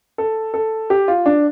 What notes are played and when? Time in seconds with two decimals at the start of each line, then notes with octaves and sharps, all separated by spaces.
0.18 A4
0.54 A4
0.90 G4
1.08 F4
1.26 D4